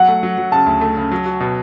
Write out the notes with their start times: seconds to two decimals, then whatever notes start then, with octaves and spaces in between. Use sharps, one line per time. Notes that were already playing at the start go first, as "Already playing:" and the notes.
Already playing: F#3 F#5
0.08 A3
0.23 F#3
0.38 F#3
0.52 C#3 A5
0.66 D2
0.81 A3
0.97 C#3
1.12 F#3
1.26 F#4
1.40 B2